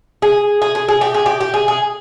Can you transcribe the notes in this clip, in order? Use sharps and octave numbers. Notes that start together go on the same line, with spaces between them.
G#4
G#4
G#4
G#4
G4
G#4
G4
G4
G#4
G#4